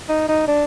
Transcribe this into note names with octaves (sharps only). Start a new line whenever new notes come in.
D#4
D#4
D4